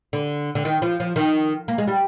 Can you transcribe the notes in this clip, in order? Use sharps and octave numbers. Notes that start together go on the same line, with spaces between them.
D3
D3
D#3
F3
F3
D#3
A#3
G#3
G3